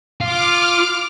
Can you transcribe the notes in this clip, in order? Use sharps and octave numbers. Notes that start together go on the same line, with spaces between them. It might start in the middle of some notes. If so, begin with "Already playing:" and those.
F4 D6 F6